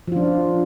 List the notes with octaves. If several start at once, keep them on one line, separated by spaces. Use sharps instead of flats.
F3 D4 F4